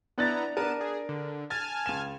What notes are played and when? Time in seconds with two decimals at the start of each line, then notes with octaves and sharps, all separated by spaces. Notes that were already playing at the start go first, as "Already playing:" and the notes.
0.18 B3 D4 E4 A#5 F#6 A6
0.57 B3 D4 A#4 A5 D#7
0.81 G#4
1.09 D3
1.50 G#5 A5 F6 A6
1.86 C#2 E7